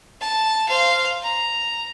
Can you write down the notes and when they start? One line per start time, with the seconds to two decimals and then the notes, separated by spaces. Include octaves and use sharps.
0.21 A5
0.68 C5 F5
1.23 A#5